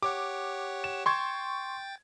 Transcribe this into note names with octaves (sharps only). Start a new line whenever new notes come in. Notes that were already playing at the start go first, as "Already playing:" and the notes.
G4 C#5 F#5 D6
E7
G5 C6 C#6 G#6 A6